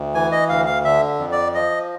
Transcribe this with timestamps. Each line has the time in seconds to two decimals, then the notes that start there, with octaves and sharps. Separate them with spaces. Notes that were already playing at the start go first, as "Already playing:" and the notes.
Already playing: D2
0.14 E3 G#5
0.32 D#5
0.49 D2 F5
0.66 F5
0.85 D3 E5
1.19 F2
1.32 D5
1.54 F3 D#5